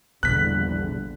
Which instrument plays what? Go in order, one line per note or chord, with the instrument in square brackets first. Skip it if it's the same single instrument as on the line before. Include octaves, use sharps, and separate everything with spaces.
[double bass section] A#1 D3 G3 [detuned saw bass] E2 [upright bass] B2 [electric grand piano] F#6 B6